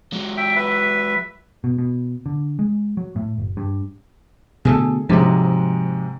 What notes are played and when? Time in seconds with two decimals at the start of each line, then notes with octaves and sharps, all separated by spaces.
0.12 F#3 G#3
0.37 E5 G5
0.56 B4 E5
1.64 B2
1.78 B2
2.26 D3
2.59 G#3
2.97 F#3
3.16 A2
3.38 F#1
3.57 G2
4.65 B2 D3 A3 G#4 A4
5.09 G#2 C3 F3 F#3 G#3